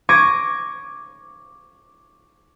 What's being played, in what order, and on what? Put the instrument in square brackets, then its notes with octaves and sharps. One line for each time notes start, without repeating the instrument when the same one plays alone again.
[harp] C#6 D6 G#6 A#6 D7 D#7